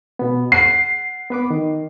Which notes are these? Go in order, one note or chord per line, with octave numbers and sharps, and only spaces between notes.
B2 B3
F#5 C7
B3 B4 D6
D#3